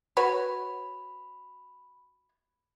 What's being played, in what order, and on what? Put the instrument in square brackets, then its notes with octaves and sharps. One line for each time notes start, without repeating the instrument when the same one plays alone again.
[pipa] F#4 B4 C#5 [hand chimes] B5